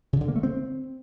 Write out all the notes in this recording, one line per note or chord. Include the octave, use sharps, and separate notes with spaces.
C#3
D3
A#3
A3
C4